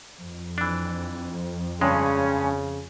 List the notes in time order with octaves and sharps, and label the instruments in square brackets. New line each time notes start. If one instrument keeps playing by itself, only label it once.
[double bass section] F2
[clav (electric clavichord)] E3 D4
[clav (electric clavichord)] G2 G#3 [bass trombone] C#3 [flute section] C#4